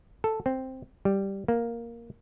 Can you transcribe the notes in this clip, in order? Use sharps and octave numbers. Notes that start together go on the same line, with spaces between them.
A4
C4
G3
A#3